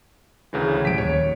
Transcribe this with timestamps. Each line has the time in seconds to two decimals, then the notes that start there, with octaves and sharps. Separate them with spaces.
0.53 D2 C#3 E3
0.85 D1 F3 G3 B6 D7
0.98 D#1 D#2 C#5